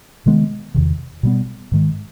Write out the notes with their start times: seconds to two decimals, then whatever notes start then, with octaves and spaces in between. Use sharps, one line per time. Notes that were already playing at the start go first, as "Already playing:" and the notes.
0.26 C3 D#3 G#3 B3
0.74 E2 C3 D#3
1.23 B2 G3 B3
1.72 G#2 D#3 G#3